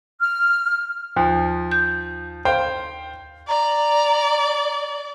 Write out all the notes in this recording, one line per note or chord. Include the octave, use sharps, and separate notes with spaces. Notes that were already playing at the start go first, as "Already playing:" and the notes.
F6
D#2 F3
G6
C5 F5 G5
D5 A#5